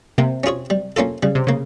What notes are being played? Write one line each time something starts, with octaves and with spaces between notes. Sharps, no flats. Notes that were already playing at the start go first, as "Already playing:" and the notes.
C3 A#3
C#4 F4 G#4 C#5
G3
A#3 C#4 F4 A4
C#3 G3
C3
C#3 A#3